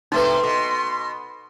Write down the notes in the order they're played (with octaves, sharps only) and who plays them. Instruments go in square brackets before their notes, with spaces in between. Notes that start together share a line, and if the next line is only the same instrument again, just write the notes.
[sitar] C3 A3 [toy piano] D#4 B4 [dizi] C6
[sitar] B2 [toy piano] D6